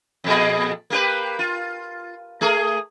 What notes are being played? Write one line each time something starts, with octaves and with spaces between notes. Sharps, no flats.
F2 A#2 G#4
A#3 G4 B4
F4
A3 G#4 A#4